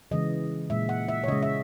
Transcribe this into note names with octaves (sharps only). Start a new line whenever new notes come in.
C#3 E3 G#3 D#5
A#2 G#3 E5
F#5
E5
C#5
C#3 G#3 D#5
E5